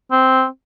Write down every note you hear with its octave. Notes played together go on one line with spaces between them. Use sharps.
C4